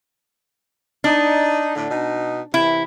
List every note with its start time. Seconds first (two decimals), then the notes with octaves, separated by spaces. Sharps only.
1.04 D4 D#4
1.75 A2 D3
1.89 B2 D#4
2.54 C3 E3 E4